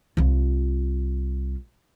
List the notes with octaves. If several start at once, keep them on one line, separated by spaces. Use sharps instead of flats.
C2 F4